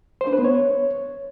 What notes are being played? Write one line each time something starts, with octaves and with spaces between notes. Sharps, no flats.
C5
D4
B4
B3
C#5